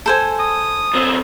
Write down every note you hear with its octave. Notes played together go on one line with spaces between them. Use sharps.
A4 C5 G#5
D#6
F#2 C4